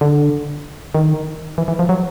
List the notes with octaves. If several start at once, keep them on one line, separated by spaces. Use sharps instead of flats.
D3
D#3
E3
E3
F3
F#3